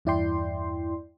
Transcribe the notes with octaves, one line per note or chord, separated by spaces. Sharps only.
E2 G2 E4 D5 G5 C6